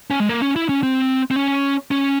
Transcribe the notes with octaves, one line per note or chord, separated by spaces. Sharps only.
C#4
G#3
A#3
C#4
E4
C#4
C4
C4
C#4
C#4